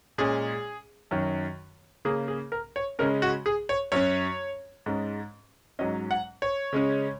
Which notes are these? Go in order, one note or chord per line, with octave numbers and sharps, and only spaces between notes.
A#2 G#3 C#4 G#4
F#2 D#3 F#3
C#3 A#3 C#4 G#4
G#4
A#4
C#5
C#3 G#3 C#4 A#4
F#4
G#4
C#5
F#2 F#3 C#4 C#5
G#2 G#3 C#4
G#2 F#3 C#4 D#5
F#5
C#5
C#3 G#3 C#4